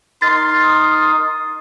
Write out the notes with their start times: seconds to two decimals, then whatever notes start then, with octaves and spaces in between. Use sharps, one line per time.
0.22 D#4 A#4 C6 A6
0.65 D#6